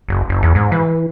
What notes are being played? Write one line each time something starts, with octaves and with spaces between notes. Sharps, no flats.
F#1
F#1
E2
G#2
E3